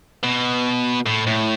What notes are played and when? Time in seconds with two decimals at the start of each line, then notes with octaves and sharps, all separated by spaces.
0.24 B2
1.06 A2
1.27 A2